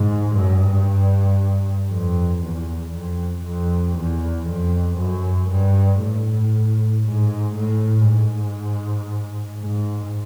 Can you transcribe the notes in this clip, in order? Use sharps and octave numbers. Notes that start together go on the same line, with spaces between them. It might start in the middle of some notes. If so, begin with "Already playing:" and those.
Already playing: G#2
G2
F2
E2
F2
F2
E2
F2
F#2
G2
A2
G#2
A2
G#2
G#2